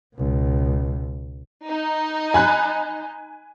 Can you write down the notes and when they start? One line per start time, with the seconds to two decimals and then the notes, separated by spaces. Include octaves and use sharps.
0.16 C#2 B2
1.66 D#4
2.34 G#5 B5 F#6